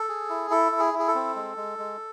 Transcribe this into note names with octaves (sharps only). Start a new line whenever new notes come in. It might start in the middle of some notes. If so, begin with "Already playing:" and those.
Already playing: A4
G#4
E4
E4 A4
E4
G#4
E4
G#4
A4
C4
G#3
G#3
G#3